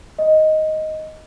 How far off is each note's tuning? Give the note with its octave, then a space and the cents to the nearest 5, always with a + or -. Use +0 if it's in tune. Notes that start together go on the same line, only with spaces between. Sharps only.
D#5 +5